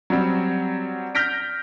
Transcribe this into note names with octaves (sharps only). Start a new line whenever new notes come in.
F#3 G3 C4
F6 G6 A#6 B6 D7